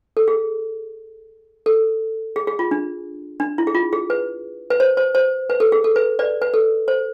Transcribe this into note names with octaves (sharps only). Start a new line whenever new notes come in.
A4
G#4
A4
G#4
G#4
F4
D4
D4
E4
G#4
F4
G#4
B4
B4
C5
C5
C5
B4
A4
G#4
A4
B4
B4 D5
B4
A4
C5